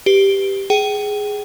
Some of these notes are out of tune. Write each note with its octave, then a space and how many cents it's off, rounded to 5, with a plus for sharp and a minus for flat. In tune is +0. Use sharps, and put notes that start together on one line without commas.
G4 +0 B4 +0
G#4 +0 G5 -30